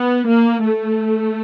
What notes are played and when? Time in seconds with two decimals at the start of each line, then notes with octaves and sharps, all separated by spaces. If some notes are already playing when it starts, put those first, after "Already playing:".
Already playing: B3
0.27 A#3
0.64 A3